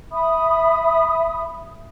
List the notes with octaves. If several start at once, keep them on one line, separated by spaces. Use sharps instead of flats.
E5 B5 D#6